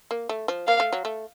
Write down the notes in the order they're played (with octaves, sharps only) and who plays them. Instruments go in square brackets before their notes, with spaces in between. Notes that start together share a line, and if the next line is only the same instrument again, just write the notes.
[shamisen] A#3
A3
F3
[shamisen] A#3 [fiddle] F5
[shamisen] A3
F#3
A3